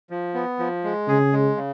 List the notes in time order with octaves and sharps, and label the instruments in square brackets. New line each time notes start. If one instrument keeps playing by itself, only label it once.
[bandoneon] F3
B3
F3
G#3
[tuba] C#3 [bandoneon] G#4
[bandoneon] G#3
C#3